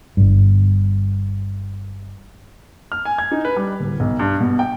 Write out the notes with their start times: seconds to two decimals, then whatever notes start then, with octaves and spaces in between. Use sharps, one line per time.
0.17 G1 G2
2.92 F6
3.05 G#5
3.18 G#6
3.31 D#4
3.45 B4
3.56 G3
3.80 D1
4.00 B1
4.19 G2
4.41 B2
4.59 G5